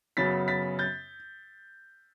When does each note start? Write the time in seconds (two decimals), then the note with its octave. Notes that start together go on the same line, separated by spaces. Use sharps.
0.17 F#2 C#3 F#3 B3 A6 B6
0.48 A6 B6
0.79 G6 A6